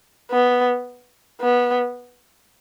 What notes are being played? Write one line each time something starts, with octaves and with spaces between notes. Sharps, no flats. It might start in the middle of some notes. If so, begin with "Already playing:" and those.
B3
B3